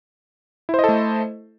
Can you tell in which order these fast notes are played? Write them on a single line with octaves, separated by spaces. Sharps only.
E4 C5 D#5 A4 A3